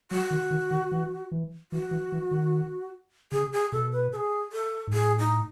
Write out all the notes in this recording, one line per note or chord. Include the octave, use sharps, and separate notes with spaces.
F#3 F#4
D#3
D#3
D#3
E3
E3
E3 F#4
E3
E3
D#3
C#3 G#4
G#4
B2 A4
B4
A4
G#4
A4
G#2
A2 G#4
D#4